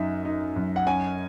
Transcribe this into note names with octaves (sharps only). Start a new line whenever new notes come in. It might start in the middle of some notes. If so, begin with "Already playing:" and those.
Already playing: F#2 D#4 E5
D#4
F#2
F#5
C#4 G#5